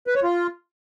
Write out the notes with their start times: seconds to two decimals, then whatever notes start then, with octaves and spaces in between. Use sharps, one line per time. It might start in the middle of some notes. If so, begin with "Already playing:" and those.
0.07 B4
0.15 C#5
0.23 F4